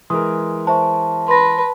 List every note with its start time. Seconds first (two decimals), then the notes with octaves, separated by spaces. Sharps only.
0.10 E3 G#3 A#4 C6 D#6
0.67 C5 E5 A5 C#6
1.28 B4 C6 A#6